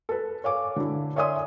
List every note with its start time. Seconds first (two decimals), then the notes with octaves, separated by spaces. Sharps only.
0.09 A4 B4
0.44 C#5 F5 G#5 D6
0.76 D3 E4
1.16 C#5 D5 E5 G#5 C6 D#6